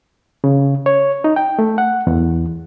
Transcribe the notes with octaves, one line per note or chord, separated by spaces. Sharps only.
C#3
C#5
D#4
G5
A3
F#5
E2